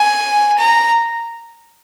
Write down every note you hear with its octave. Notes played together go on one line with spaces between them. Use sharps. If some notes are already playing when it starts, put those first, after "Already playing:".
Already playing: G#5
A#5